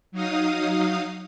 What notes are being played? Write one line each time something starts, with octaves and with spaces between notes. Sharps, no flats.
F#3 D#4 F5 D#6